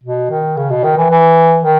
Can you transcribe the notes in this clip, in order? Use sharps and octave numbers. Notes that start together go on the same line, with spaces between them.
B2
D#3
C#3
B2
D#3
E3
E3
D#3